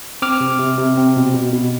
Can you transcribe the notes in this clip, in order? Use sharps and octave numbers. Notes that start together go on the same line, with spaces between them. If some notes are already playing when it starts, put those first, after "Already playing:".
C4 D6 F6
C3
C3
C3
C4
B2
B2
B2